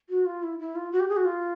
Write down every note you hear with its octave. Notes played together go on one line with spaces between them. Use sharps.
F#4
F4
E4
E4
F4
F#4
G4
G#4
F#4
F4